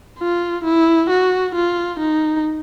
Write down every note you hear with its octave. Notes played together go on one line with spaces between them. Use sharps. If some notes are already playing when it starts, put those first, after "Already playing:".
F4
E4
F#4
F4
D#4